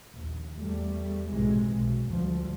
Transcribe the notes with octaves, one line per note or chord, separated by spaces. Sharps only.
A#1 D#2
E2 G3 A3
B1 F#2 A2 C3 E3 G#3
B1
D2 F3 G3